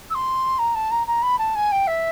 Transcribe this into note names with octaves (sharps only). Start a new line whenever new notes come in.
E6
C6
A#5
A5
A#5
A#5
B5
A5
G#5
G5
E5